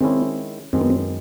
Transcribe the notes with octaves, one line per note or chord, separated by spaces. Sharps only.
D#3 G#3 C4 C#4 E4
F#2 D#3 G#3 C4
B3
C4